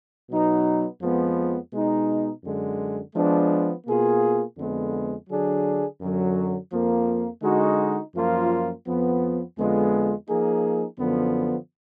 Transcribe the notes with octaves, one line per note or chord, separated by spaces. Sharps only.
B2 F#3 B3 D#4
F2 F3 G#3 B3
B2 G#3 D#4
F#2 D3 G#3
F3 G#3 B3 D4
B2 A#3 F4 G#4
F2 D3 G#3 B3
D3 F#3 D4 G#4
F#2 D3 F#3
F2 F3 A#3
D3 G#3 D#4 F#4
F#2 F3 A#3 F4
F2 F3 B3
F2 D3 G#3 B3 F4
F3 A#3 D#4 G#4
F#2 D3 F3 B3